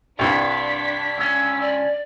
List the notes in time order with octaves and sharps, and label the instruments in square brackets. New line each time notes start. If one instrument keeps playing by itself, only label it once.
[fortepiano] C2 G2 [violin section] D4 B6
[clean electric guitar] C#2 C#4 [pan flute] E6
[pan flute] D5